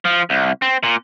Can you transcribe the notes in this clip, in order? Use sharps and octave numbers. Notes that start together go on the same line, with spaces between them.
F3
C2
C4
A#2